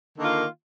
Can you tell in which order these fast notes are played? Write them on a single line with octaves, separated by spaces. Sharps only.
D#3 D3 A#3 F4